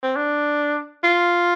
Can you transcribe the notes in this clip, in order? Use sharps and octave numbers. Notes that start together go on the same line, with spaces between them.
C4
D4
F4